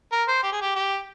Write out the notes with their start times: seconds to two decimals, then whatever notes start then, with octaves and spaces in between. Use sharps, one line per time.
0.12 A#4
0.28 C5
0.43 G4
0.52 G#4
0.61 G4
0.76 G4